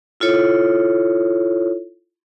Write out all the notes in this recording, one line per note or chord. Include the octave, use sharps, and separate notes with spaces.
E4 F4 A4 C#5